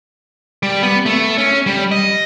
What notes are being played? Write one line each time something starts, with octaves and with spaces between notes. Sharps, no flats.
G3
B3
A3
C#4
G3
D#5